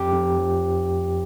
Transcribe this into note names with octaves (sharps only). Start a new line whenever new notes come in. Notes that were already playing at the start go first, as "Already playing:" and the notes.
Already playing: F2 G4
F2
F3